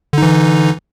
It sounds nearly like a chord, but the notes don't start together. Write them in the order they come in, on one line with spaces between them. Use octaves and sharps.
D3 D#4 E3